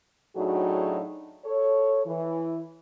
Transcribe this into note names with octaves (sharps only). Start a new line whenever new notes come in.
A2 F#3 D4 D#4 F#4 G#4
A4 C#5
E3